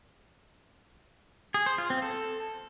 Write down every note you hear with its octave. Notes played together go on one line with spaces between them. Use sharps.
G#4
C5
F4
C4
A4